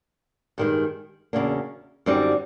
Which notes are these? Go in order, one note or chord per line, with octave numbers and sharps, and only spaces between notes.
G2 D#3 G#3
E2 C#3 F#3 A#3 D4
F#2 D3 G3 C4 D#4